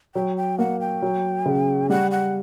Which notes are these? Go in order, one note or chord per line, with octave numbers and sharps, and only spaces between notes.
F#3 G5
G5
A#3 F#5
G5
F#3
C#3
G3 F#5
F#5